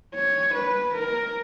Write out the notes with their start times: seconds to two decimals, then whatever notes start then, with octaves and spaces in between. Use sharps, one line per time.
0.14 C#5
0.54 B4
0.95 A#4